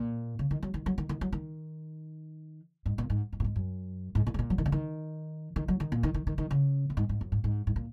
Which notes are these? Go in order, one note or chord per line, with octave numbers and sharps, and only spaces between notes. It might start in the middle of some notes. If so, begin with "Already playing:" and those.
Already playing: A#2
C#3
D#3
F#3
D#3
F#3
D#3
D#3
F#3
D#3
G#2
A#2
G#2
G#2
A#2
G#2
F#2
G#2
A#2
G#2
A#2
F#3
D#3
C#3
D#3
D#3
F#3
D#3
A#2
D#3
D#3
D#3
D#3
C#3
A#2
G#2
G#2
F#2
G#2
G#2
G#2
A#2